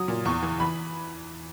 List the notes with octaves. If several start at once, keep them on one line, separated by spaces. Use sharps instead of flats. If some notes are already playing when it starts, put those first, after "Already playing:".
Already playing: F#3 D#6
A#2
E2 C#6
E3
E3 B5